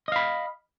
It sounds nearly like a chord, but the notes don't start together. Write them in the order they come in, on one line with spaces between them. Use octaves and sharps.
D#5 F5 B5